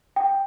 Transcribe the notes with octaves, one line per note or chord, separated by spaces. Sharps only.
G5